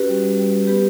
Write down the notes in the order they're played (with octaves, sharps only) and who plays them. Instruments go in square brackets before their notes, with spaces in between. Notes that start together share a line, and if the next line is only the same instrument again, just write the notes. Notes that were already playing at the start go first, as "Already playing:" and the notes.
Already playing: [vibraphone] C#4 F#4 G4 B4
G3
G3
G3
G3
B3 G4 B4